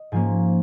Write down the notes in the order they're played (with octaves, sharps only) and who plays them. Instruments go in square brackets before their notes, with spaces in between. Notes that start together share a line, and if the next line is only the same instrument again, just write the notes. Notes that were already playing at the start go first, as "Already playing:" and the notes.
Already playing: [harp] D#5
G#2 F3 A#3 C#4 G#5